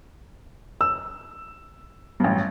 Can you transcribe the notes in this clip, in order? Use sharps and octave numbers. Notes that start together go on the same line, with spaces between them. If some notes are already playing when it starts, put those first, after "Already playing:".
E6
A1 G2